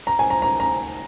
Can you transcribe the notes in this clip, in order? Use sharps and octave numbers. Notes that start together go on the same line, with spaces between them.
A#5
G#5
A#5
A#5
A#5